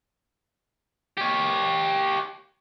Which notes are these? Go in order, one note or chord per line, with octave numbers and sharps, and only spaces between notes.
G4 C#5